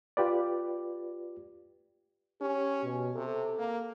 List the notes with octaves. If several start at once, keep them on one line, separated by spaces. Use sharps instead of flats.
F4 G4 B4 D5
C#4 G4
B2
C3 A4
A#3